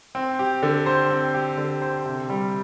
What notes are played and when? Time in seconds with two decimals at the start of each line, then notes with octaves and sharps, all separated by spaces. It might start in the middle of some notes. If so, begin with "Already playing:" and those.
0.15 C4
0.39 G4
0.63 D3
0.86 C5
1.10 C4
1.34 G4
1.57 D3
1.82 C5
2.05 C3
2.30 G3